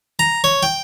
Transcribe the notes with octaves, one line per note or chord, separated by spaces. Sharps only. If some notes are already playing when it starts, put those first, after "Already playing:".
A#5
C#5
G5